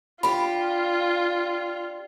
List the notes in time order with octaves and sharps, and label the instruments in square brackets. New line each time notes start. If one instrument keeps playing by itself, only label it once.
[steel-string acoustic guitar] D4 G4 [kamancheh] F4 [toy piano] B5